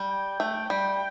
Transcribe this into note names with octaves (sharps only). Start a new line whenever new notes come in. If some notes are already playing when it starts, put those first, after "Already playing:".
Already playing: G3
G5
A3
G3